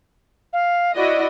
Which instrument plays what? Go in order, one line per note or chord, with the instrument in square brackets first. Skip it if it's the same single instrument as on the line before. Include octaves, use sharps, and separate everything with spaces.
[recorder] F5
[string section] E4 F#4 D#5 [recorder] D5